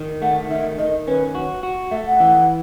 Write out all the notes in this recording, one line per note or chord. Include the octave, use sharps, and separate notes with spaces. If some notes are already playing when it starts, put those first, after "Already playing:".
Already playing: D#3
A3 F#5
D#3 E5
D#3 D#5
C#4 B4
F#4
F#4
A3 E5
F#5
E3